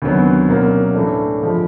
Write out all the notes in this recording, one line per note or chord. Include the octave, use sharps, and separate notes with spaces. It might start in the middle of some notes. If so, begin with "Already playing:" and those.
D2 C3 D#3 F#3 B3
C2 B2 F#3 A#3 C#4
A2 E3 A3 D4
G2 D3 F3 G#3